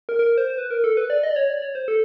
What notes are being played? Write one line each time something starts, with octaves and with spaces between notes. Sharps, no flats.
A#4
A#4
C5
C5
B4
A#4
A4
B4
D5
D#5
D5
C#5
D5
C#5
C5
A4